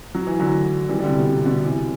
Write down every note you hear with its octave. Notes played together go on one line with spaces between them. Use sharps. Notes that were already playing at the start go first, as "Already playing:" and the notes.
F#3
E3
D3 F#3
E3 G3
E3 G3
D3
C3
B2
C3
B2 D3
C3 E3